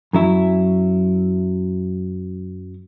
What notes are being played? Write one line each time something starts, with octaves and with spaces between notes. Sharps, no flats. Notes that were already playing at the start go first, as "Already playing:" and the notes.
F#2 F#3 E4